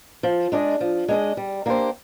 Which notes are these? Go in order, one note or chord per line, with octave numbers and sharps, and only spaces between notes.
F3
G#3 D4 G#4 D#5
F3
G#3 D4 G#4 D#5
G3
A#3 D4 G4 C5